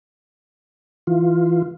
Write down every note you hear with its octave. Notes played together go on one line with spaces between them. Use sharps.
E3 F4